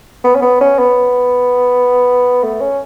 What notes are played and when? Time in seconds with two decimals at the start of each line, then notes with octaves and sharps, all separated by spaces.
0.24 B3
0.35 C#4
0.42 B3
0.61 C#4
0.79 B3
2.43 A3
2.61 C#4